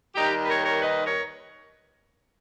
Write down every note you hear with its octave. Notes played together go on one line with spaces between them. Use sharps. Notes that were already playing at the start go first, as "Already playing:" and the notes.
D#2 D#3 G3 D#4 G4
B4
A#4 C#5
A#4 C#5
B4 D#5
A#4 C#5